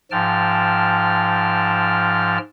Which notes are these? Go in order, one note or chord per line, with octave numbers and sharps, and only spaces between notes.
G#2 F3 G5 A5 F6